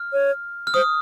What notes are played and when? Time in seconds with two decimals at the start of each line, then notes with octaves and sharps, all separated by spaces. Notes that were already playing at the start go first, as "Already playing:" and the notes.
Already playing: F6
0.13 C#5
0.67 F6
0.74 C5 D#6